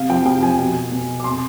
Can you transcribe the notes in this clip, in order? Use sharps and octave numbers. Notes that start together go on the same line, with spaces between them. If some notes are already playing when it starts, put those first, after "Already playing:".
Already playing: C3 F5
F3 G5
C3 G5
F3 G#5
B2
B2
D6
C3 C6